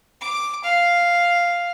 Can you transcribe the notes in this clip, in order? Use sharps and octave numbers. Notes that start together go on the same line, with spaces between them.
D6
F5